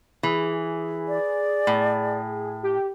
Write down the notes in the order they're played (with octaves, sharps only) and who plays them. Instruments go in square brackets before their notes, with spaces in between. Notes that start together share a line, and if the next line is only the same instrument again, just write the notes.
[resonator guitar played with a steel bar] E3 [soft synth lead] G#4
[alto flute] D5
[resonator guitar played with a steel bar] A2
[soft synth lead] G4